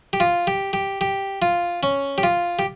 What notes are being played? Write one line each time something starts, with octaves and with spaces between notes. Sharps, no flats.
G4
F4
G4
G4
G4
F4
C#4
G4
F4
G4